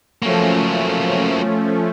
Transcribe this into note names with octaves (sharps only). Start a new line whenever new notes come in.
F3 F#3 A3 A#3 C#4